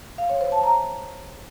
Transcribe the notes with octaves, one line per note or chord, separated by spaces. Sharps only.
F5
C#5
C5
A5
A#5